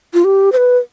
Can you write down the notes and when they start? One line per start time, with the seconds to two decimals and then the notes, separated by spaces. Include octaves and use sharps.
0.14 F4
0.24 G4
0.52 C5
0.57 B4